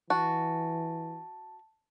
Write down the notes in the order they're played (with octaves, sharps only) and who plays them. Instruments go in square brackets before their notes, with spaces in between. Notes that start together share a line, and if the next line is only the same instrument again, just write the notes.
[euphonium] E3 [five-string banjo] F#4 [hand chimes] A5